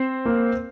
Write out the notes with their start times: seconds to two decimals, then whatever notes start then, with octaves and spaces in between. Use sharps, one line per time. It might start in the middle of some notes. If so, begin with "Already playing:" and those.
Already playing: C4 C5
0.25 A#3